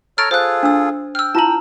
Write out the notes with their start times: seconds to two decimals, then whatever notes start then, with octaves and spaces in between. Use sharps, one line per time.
0.18 A4 C#5 A#5 F6 A6 D7
0.31 F4 G#4 A4 C5 F#6
0.63 D4 E6
1.15 G5 E6 F6
1.35 E4 F4 A5 A#5 F#7